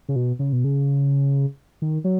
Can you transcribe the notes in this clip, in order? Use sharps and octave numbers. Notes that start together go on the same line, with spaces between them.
C#3
B2
C#3
B2
C#3
D#3
F#3